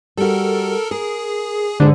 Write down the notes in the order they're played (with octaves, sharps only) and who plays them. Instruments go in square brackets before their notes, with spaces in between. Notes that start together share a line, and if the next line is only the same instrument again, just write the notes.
[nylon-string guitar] G3 F#4 [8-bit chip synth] A4 A#4
[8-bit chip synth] G#4 [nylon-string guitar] A#4
[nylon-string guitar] G#2 D4 G#4 [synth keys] D3